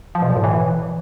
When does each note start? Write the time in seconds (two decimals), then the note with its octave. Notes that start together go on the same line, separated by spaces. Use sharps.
0.15 F3
0.22 B2
0.29 A#2
0.37 A2
0.44 E3